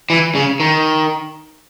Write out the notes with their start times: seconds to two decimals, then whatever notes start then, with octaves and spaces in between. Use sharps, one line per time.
0.10 E3
0.35 C#3
0.60 D#3